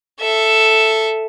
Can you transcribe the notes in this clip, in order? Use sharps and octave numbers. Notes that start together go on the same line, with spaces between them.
A4 E5